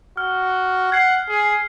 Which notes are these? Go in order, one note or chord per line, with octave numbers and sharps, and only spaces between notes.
F#4 F6
F#5 G#6 C7
G#4